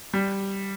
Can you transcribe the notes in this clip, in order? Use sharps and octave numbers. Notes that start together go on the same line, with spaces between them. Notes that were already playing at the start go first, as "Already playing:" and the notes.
G3